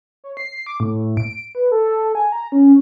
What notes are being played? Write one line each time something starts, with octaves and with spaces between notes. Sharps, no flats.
C#5
C7
D6
A2
D7
B4
A4
G#5
A#5
C#4